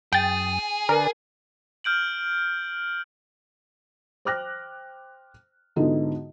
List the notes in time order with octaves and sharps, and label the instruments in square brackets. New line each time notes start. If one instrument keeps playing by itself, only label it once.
[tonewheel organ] F#2 D#6 [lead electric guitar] G#4 [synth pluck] G5 A6
[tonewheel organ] D3 B4 D5 [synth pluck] A#4
[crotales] F6 G6 D7 F#7
[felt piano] C5 G5 D6 F6 F#6 A#6
G#2 D3 B3 D#4 F4 F#4